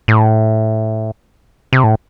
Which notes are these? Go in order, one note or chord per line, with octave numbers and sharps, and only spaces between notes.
A2
C3
A2